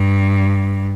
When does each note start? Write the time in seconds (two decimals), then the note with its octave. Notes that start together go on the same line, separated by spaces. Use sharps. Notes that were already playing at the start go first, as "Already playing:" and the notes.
Already playing: G2